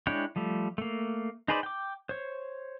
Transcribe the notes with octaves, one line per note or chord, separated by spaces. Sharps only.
G#3 D4 E4 C#5 G5
F3 G3 A3
A3 A#3
D#4 G#4 B4 C5 D5
G5 D6
C5 C#5